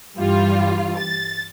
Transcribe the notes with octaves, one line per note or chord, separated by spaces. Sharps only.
G2 E3 G3 F4
A6